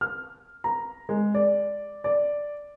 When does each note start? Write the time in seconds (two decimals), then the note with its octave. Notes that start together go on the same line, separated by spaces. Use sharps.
0.01 F6
0.64 A#5
1.09 G#3
1.35 D5
2.04 D5